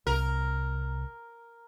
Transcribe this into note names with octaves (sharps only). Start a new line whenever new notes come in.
C2 A#4